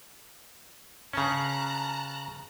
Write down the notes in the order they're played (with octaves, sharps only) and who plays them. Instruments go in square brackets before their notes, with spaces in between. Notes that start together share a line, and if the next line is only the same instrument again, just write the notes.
[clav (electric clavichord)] C#3 C#4 [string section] A5 A#5 F#6